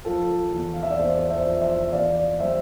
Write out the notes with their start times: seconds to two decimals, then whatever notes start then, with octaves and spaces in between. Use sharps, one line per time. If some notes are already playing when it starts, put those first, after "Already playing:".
0.05 F3 F4 A4
0.52 E2
0.73 F5
0.83 E5
0.90 D5
0.99 E2 A4 C5
1.18 D5
1.30 C5 E5
1.45 F3
1.61 C5 E5
1.93 E2 D5 F5
2.40 G3 C5 E5